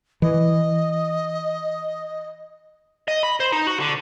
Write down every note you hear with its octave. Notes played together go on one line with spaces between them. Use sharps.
E3 D#5
D#5
B5
C5
D#4
F#4
D3